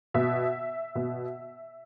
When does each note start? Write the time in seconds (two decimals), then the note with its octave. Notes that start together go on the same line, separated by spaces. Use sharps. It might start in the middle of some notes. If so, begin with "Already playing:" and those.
0.14 B2 E5
0.95 B2